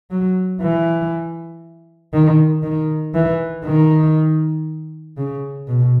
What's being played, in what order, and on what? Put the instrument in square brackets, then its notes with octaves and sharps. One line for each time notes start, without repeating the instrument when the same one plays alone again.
[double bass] F#3
E3
D#3
D#3
E3
D#3
C#3
B2